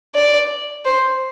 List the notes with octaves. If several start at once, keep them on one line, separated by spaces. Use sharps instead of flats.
D5
C5